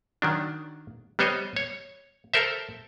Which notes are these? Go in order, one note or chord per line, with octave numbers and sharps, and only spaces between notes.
D#3 F#3 D4
G3 B3 C5 C#5 D#5
C#5
A4 A#4 C5 E5